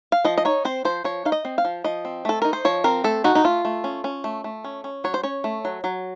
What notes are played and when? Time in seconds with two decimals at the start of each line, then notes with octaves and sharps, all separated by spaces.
0.12 F5
0.25 F3 D#5
0.38 D#5
0.45 D#4 C#5
0.65 C4 C5
0.85 F3 C5
1.04 F3 C#5
1.25 D#4 F5
1.32 D#5
1.45 C4
1.58 F5
1.65 F3
1.84 F3 D#5
2.05 C4
2.25 A3 A4
2.42 D#4 A#4
2.53 C5
2.65 F3 C#5
2.84 C4 A#4
3.04 A3 A4
3.24 D#4 F#4
3.35 D#4
3.44 A3 F4
3.65 A3
3.84 C#4
4.04 C#4
4.24 A3
4.44 A3
4.64 C#4
4.84 C#4
5.04 F#3 C#5
5.14 C5
5.23 C#4 C#5
5.44 A3
5.65 F#3
5.84 F#3